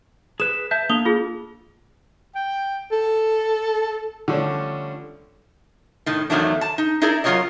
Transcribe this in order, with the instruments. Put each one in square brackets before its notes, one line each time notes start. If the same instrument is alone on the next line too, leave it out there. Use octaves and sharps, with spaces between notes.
[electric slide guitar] G#4 B4 [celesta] E7
[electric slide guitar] B4 E5 A5 [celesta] G6
[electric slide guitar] A#3 D4 A4 [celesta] D#6 F7 G7
[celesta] F4 G#4
[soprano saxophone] G5
A4
[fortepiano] D3 F3 G3 A3 C#4 D4
[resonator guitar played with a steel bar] A2 D#3
E2 D#3 F3 F#3 A3 D4
A5
D#4
D#4 E4 G#4 A#4 D5
F#3 F4 F#4 A#4 C#5 D#5